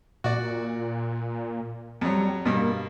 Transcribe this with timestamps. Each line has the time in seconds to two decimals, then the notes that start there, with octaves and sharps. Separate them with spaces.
0.24 A#2 F#4 D5
2.01 F2 F#3 G3
2.45 G2 B2 A#3